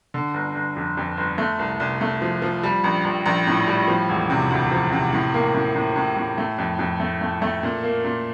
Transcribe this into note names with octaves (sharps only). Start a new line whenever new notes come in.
D3
G1
G1
F2
F2
G1
A3
C2
C2
A3
F3
F3
G3
A#1
A#1
A#1
A2
G3
F3
E1
C3
D2
F3
C3
A2
A#3
A2
A2
A2
A2
A3
F2
F2
A3
A3
A3
A#2
A#3
A#2